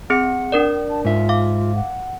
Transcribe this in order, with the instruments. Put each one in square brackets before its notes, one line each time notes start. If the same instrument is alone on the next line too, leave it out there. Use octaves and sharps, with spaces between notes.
[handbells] C4 G#4 C#7 [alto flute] F#5
[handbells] D4 A#4 D5
[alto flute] A5
[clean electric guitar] G#2 E5 [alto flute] F4
[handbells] F5 D6
[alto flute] F#5